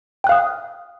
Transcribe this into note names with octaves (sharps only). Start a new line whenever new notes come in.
F5 G5 D#6 F#6